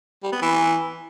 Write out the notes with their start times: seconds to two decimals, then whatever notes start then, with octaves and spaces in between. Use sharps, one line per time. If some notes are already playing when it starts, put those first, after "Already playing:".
0.23 G3
0.33 B3
0.42 E3